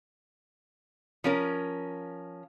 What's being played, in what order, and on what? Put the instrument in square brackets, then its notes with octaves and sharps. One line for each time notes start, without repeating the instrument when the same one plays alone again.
[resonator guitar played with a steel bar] F3 C#4 A#4